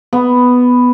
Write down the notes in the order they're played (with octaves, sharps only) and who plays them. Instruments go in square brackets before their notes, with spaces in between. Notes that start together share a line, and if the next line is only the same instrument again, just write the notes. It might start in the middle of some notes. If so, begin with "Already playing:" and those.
[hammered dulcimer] B3